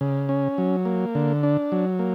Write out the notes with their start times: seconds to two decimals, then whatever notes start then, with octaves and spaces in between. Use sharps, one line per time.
0.01 C#3
0.29 C#4
0.58 F#3
0.85 A#3
1.15 D3
1.43 D4
1.72 F#3
1.99 A#3